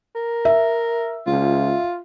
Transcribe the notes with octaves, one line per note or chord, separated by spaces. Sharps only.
A#4
E5
C#2 F4